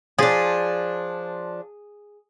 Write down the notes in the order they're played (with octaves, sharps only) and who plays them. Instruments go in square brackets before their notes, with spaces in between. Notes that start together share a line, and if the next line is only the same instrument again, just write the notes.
[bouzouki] F3 D4 [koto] G#4